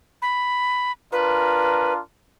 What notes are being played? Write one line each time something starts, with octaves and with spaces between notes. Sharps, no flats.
B5
D4 F4 A#4 B4